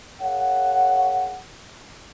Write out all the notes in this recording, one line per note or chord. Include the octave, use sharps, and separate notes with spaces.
G#4 A#4 C#5 F5 F#5